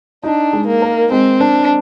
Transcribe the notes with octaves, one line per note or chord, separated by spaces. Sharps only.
D4 D#4
G#3
A#3
A#4
G#3 C4
C4 D4